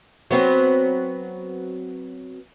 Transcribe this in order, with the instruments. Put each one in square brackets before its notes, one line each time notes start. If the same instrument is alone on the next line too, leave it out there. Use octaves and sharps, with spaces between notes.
[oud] F#3 B3 C4